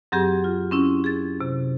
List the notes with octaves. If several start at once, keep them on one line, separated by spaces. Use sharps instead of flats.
F#2 F#3 C4 G4 G#4
F4
C4 C#4 E4
G#4 A6
C3